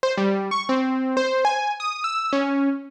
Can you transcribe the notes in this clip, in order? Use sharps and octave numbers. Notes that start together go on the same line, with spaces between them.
C5
G3
C#6
C4
C5
G#5
D#6
E6
C#4